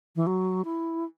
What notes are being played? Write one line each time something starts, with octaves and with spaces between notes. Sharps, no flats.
E3
F#3
E4